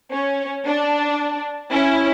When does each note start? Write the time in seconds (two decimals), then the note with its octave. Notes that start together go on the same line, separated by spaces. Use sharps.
0.13 C#4
0.66 D4
1.71 C#4 E4